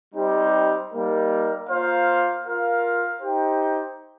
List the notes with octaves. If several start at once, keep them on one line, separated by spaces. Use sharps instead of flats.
G3 C4 D#4 G4
G3 A#3 D#4 A#4
A#3 F4 C5 F5
F4 A#4 F5
D#4 G4 C5 G5